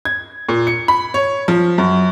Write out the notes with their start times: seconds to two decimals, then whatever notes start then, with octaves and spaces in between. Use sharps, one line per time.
0.05 G#6
0.49 A#2
0.67 C#7
0.88 B5
1.14 C#5
1.48 F3
1.78 F#2